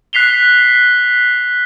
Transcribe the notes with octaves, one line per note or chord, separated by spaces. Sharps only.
F#6 B6 C7 F7 G7